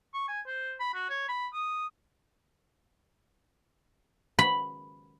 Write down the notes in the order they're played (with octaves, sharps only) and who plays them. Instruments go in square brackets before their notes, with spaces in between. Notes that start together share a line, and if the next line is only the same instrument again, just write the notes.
[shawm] C#6
G#5
C5
B5
F#4
C#5
B5
D#6
[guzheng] B5